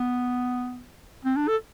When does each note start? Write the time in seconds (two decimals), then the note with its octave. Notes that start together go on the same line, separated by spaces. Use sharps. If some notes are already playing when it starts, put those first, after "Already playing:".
Already playing: B3
1.25 C4
1.36 D4
1.48 A4